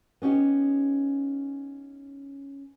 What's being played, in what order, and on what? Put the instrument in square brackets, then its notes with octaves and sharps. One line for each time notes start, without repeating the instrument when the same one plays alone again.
[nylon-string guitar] B3 C#4 D#4 G4